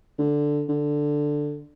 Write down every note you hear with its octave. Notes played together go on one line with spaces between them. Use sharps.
D3
D3